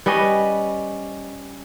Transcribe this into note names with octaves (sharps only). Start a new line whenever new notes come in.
G3 C#4 B4 D#5